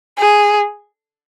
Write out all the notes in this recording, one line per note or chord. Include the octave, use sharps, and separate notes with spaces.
G#4